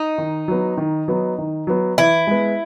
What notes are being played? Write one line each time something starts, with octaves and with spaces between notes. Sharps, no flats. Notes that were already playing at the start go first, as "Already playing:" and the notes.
Already playing: D#4
D#3
F#3 B3
D#3
F#3 B3
D#3
F#3 B3
E3 E4
G#3 B3